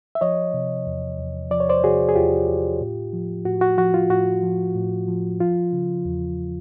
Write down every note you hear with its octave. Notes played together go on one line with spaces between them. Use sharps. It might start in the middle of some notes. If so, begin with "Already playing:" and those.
E5
F3 C#5 D#5
C3
E2
E2
F3 D5
C#5
C5 D5
C3 F#4 G#4
G#4
E2 F4 G4
E2
A2
F3
A2 F#4
F#4
F3 F#4
F4
A2 F#4
F3
A2
F3
F3 F4
C#3
E2